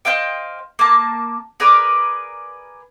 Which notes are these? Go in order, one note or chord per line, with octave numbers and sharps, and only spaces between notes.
C5 D#5 F5 G5
A#3 A5
G#4 A#4 B4 D5